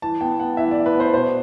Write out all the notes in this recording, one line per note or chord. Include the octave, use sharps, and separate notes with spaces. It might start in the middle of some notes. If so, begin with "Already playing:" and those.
E3 A5
B3 G5
B3 F#5
E3 E5
D5
E3
B4
B3
C5
B2 C5